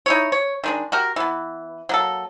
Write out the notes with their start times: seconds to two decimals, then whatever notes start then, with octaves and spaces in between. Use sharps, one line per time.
0.06 D#4 E4 C#5
0.32 C#5
0.64 D#3 G#3 D4
0.92 F#4 G4 A#4
1.16 E3 B3
1.89 F#3 A#3 A4